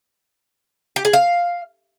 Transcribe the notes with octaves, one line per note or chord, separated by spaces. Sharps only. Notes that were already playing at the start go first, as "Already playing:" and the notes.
G4
G#4
F5